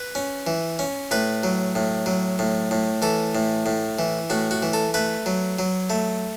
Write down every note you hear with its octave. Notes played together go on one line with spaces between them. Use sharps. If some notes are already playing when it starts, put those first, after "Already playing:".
Already playing: B4
C#4
E3
C#4
A2 B4
F#3
A2
F#3
A2
A2
E3 A4
A2
A2
E3
A2 F#4
F#4
E3
A4
A3 B4
F#3
F#3
A3